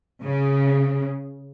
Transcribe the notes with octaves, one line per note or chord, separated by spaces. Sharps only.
C#3